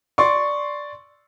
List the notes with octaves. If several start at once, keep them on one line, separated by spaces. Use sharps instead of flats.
D5 C6 C#6